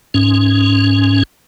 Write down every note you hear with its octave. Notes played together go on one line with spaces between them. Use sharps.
G#2 C#4